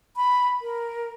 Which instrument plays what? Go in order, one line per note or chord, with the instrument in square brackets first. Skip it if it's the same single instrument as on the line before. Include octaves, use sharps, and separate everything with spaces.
[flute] B5
A#4